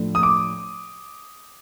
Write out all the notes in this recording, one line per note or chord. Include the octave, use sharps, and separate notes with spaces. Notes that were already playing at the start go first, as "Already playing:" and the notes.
Already playing: A2 F3 A3 D4
D#6
D6